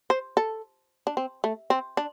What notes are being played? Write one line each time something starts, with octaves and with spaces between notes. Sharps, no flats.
C5
A4
D4
C4
A3
C4
D4